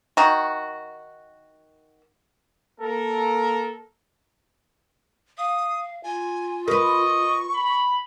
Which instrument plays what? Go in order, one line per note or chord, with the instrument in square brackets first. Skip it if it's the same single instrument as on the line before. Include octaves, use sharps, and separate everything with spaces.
[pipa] D#3 F#4
[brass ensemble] A#3 A4 A#4
[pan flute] F5 [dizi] D#6
[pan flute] F4 [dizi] G#5
[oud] A#4 B4 [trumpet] D#5 [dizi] C#6
[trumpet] B5